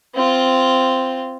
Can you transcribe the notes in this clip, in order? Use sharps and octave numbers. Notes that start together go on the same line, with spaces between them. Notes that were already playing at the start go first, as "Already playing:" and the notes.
C4 F4